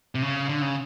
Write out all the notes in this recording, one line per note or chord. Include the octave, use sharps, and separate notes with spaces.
C3
C#3
D3
C#3